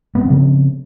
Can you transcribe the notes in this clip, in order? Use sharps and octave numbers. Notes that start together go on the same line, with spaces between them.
C#3 F3 B3 C4